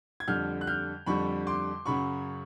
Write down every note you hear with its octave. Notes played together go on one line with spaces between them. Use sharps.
G#6
F2 D3 G3 F6 G6
F#6
F6 G6
F2 D3 G3 B5 C#6
C6 D6
F#2 C#3 F#3 B5 C#6